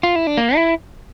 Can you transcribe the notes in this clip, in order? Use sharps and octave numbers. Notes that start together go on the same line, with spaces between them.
F4
E4
D4
A#3
E4